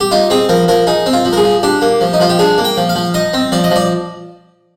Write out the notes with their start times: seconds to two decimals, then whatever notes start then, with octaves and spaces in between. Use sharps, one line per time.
0.01 G4
0.11 D#4 F4
0.30 C4 G#4
0.49 F3 A#4
0.68 F3 A#4
0.87 D#4 G#4
1.06 C4
1.13 F4
1.25 F3
1.33 A#4
1.37 G#4
1.44 F3
1.63 D4 G4
1.82 A#3
2.01 F3
2.13 D#4
2.20 F3 F4
2.30 G4
2.39 D4 G#4
2.58 A#3
2.65 G5
2.77 F3
2.89 F5
2.95 F3
3.14 D#4 D#5
3.34 C4
3.52 F3 D5
3.64 D#5
3.71 F3
3.76 D5